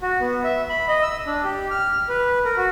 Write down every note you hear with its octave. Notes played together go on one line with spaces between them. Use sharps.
F#4
B3
E5
B5
D#5
E6
D4
G4
F6
B4
A#4
F#4